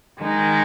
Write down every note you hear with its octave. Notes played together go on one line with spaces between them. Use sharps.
D#3 G#3 D#4